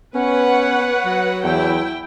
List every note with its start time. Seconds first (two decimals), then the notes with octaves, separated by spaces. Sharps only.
0.15 B3 C#4 B4 C#5 F#5
1.05 F#3
1.44 E2 E4 G5